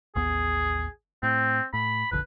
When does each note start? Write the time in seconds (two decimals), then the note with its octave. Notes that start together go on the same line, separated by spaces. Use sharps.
0.16 A1 D#2 B3 G#4
1.23 A2 C4
1.73 A2 B5
2.12 F1 A#1 D3 B4